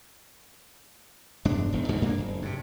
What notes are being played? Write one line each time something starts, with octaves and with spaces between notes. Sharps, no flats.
E1 G2 G#3 D4
E1 E2 D#3
B1 G#2 B2 D#3
G2 A#3 C4 D4
F#1
G2 C3